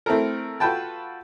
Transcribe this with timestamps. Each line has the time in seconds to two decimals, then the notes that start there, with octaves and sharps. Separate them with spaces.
0.06 A3 C4 E4 A4 A#4
0.60 F4 F#4 A4 B4 G5 A5